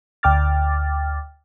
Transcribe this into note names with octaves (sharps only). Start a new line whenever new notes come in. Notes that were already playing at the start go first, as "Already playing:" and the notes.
D2 G5 D6 F6 A6